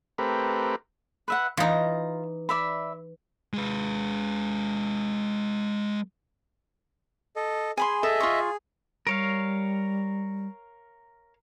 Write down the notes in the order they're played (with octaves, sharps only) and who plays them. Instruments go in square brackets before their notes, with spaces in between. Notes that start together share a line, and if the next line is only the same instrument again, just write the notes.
[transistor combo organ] A3 C4 G4 A#4 B4
[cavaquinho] B4 E5 F#5
[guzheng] E3 D#4 [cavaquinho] F4 A#5
[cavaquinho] D5 E5 B5
[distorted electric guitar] G#3 B4
[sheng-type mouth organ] A4 D#5
[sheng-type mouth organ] G#4 [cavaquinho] G#5 B5 C6
[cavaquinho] A4 [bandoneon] D#5 E5
[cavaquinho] F4 C6 C#6
[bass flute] G3 [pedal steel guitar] A#4 C#5 F5